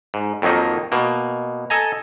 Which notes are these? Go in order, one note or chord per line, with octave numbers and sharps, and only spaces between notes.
G#2
F2 D#3 F#3 A#3 D#4
B2 A#3
A4 D#5 G#5 A#5